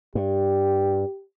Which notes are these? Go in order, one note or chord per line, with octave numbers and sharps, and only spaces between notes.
G2 G4